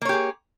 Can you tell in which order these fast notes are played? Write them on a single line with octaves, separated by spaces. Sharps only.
A#3 C#5 G4 G#4